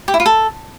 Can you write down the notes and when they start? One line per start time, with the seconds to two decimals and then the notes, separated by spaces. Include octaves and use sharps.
0.08 G4
0.14 E4
0.20 F4
0.26 A4